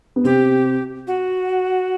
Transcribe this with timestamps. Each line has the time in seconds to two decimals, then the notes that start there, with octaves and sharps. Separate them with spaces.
0.16 B3
0.24 C3 C4 G4
1.07 F#4